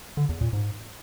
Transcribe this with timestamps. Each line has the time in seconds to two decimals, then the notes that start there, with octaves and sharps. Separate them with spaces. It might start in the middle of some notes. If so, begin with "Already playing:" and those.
0.17 D3
0.29 E2
0.41 A#2
0.53 G#2